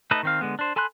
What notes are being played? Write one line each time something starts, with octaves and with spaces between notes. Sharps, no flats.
A3 D#4 A4 B4 D#5
D#3 C4 F5
D3 G#3 B3
D4 C5
A4 G#5 B5 C6 F#6